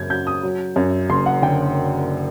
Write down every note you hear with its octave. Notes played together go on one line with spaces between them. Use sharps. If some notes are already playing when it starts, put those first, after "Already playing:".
Already playing: F#2 C#3 A#3 G6 G#6
F#3 G6
D#6
F#3
F#2
F#1 C6
F#5
D3 G5